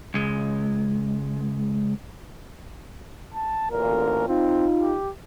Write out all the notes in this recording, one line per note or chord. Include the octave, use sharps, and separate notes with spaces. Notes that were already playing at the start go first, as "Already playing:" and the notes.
C#2 G#3
A5
A1 D2 A#2 A#4
C4 D#4 F4
G4